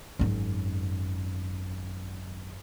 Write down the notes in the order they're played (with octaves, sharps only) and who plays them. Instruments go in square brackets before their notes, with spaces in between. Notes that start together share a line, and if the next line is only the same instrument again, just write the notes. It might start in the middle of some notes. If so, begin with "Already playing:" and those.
[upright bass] G#1 F#2